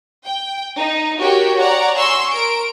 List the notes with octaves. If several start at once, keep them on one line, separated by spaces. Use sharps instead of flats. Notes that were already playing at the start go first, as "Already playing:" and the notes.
G5
D#4
F#4 G4 A#4 C#5 G5
C#5 D5 F#5 A#5
G#5 C6 C#6 E6
A#4 D7